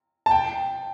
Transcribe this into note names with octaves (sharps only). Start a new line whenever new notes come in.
A5
G5